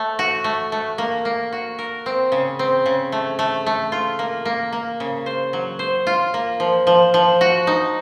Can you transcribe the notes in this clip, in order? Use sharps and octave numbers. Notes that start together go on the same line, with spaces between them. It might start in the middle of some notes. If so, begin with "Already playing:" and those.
Already playing: A3
F#4
A3
A3
A#3
A#3
F#4
A#4
C4
C#3
C4
C#3
A3
A3
A3
F4
A#3
A#3
A#3
C#3
C5
F#3
C5
F4
A#3
F3
F3
F3
F#4
D#4